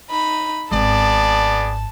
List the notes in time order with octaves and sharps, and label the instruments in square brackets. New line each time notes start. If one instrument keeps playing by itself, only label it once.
[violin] D#4 B5
[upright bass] G#1 G#2 [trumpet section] B3 G#4 D5 [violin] A5